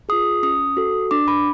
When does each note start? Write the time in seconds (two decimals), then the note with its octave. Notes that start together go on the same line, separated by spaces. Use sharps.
0.09 F4 G#4 D#6
0.43 C#4 D#6
0.77 F#4 A4
1.11 D4 D6
1.28 B5